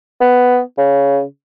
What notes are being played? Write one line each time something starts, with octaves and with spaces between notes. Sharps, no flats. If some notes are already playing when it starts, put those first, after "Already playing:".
B3
C#3